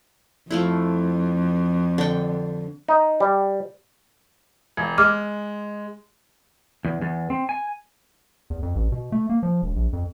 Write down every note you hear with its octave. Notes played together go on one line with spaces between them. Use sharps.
F2 F3 A3 E4
D3 G5
D#4
G3
E1
G#3 D6 F6
E2
E2
C4
G#5
E2
F2
A1
B2
A3
A#3
F3
E1
A#1
F2